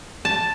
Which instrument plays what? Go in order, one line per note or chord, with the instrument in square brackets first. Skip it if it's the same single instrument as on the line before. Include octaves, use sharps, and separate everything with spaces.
[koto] A5